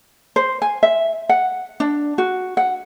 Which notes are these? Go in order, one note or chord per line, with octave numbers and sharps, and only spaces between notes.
C5
G#5
E5
F#5
D4
F#4
F#5